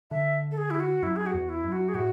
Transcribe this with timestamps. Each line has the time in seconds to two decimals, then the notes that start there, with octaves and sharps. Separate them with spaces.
0.11 D3 E5
0.51 A4
0.58 G#4
0.70 E4
0.80 F#4
1.02 F#2 E4
1.16 G#4
1.26 F#4
1.34 E2
1.49 E4
1.64 F#2
1.72 F#4
1.89 G#4
1.95 A2 F#4